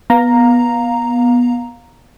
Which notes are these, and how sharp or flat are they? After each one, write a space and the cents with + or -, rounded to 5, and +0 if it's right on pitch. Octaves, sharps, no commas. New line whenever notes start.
B3 -15 F5 +15 A#5 +0